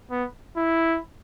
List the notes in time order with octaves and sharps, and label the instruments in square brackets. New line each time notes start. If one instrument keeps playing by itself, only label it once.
[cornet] B3
E4